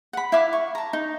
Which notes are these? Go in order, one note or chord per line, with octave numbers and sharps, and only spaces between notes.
F#5 B5
E4 E5 F5 D6
C#6
A5 A#5
D#4